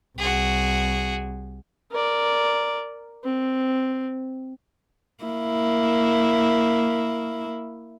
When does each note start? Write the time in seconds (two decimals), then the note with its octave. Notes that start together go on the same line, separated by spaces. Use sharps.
0.18 C2 F#4 G#4
1.91 A#4 D5
3.24 C4
5.24 A#3 E4